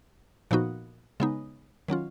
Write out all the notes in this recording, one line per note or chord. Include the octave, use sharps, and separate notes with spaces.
A#2 F3 B3 D#4 F#4
C#3 G#3 B3 D#4
D#3 F#3 C#4 F4